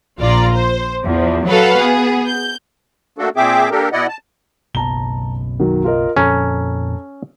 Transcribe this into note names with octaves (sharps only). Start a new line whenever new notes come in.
A#1 F4 D5 A#5
C5
E2 F3
F#3 F#4 A4 B4 F5 F#5
B3 G#4
G6
A3 A#3 D4 F#4 A4
A#2 C4 G#4 E5 G5 D6
A#3 D4 G4 A4 A#4
B2 E4 D5 D#5 F#5
A5
F#1 B1 B2 A5 A#5 G7
D#3 F#3
F4 A#4 D#5
F2 A#2 F3 C#4 A4 A#5